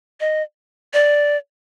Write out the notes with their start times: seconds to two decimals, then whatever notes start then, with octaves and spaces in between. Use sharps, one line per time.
0.20 D#5
0.93 D5